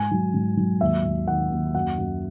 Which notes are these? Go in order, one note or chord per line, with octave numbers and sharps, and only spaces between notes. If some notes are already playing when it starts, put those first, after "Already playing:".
Already playing: G#2 G#5
F#3
G#2
F#3
D#2 E5
D#2
D#3 F#5
D#2
F#2 F#5
F#2